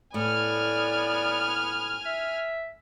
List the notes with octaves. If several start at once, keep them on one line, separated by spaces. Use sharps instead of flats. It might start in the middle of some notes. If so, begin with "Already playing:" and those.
A2 B3 D5 G#5 F6
E5